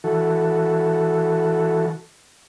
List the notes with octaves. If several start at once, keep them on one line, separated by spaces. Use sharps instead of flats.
E3 F#4 A4